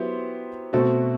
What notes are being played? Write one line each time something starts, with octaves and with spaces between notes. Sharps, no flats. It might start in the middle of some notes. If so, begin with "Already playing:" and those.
Already playing: F#3 B3 E4 G4 C5
B2 A3 C4 F#4 A4